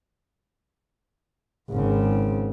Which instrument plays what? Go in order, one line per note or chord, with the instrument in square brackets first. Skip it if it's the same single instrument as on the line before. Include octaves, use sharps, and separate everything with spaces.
[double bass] G#1 C#3